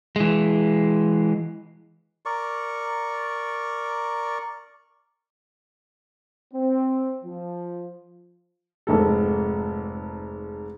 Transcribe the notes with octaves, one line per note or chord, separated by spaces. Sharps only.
E3 G#3
A#4 D5 C#6
C4
F3
F1 G#2 A4